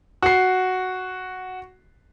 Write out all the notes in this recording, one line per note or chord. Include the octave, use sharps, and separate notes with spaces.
F#4 C7